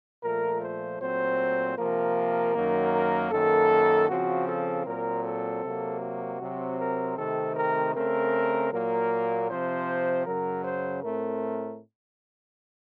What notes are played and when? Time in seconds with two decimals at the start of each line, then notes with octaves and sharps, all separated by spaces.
0.23 A#2 F3 A3 A#4
0.61 C5
1.00 A#2 F#3 A3 C4 C5
1.77 C3 F3 A#3 A#4
2.54 F#2 D#3 F#3 A#3
2.92 A#4
3.31 F#2 D#3 A#3 A4
4.09 C#3 F3 C4 F#4
4.48 A4
4.86 A#2 F#3 C4 A#4
5.25 A4
5.63 C3 F#3 A#3
6.01 F#4
6.41 C3 F#3 C4
6.79 A#4
7.17 C3 D#3 A3 C4 A4
7.56 A#4
7.94 C#3 A3 C4 A#4
8.72 A#2 F#3 A#3 A#4
9.50 C3 F3 C4 C5
10.26 F#2 C#3 F#3 A#4
10.64 C5
11.03 A2 A3 C4 A#4